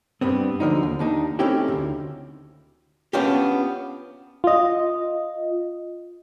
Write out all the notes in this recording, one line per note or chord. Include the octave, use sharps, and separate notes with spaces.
G2 G3 B3 C4
D2 D3 F3 D#4
D#2
D#2 D4 D#4
A3 C4 C#4 D#4 E4 G4
D2 G2
B3 C#4 D4 F4 G4
F4 D#5